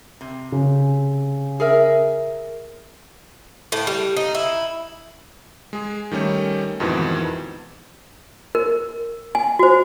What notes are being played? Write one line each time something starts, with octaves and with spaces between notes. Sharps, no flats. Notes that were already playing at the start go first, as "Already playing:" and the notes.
C3
C#3
G#4 A#4 E5
A2
G3
D#4
E4
G#3 G#4
D#3 G3 A3 C#4
F2 G#2 B2 D#3 E3
A#4
G#5
F#4 C5